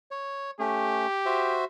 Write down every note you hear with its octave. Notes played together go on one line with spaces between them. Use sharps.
C#5
A3 C#4 G4
F#4 C5 E5